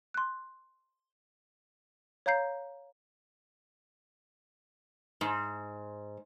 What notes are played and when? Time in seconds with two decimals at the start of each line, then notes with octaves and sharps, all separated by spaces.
0.14 C6 F#6
2.26 C#5 F5 A#5 G6 C7
5.21 G#2